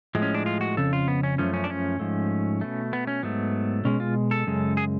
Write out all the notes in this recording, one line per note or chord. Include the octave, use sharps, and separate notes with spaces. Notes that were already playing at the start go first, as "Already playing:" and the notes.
A2 F3 G#3
C#4
D4
F4
F#4
F2 C#3 A4
F4
B3
C#4
F#2 F3 A3 C#4
C#4
D4
C#4
G#2 F3 A3
B2 A3
B3
C#4
G#2 F#3 A3 B3
B2 G#3 C#4
F4
A4
F#2 C#3 G#3
G#4